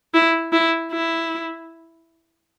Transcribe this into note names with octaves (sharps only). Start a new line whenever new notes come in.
E4
E4
E4